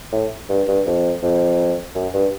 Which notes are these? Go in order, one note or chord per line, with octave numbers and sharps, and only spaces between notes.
A2
G2
G2
F2
F2
F#2
G2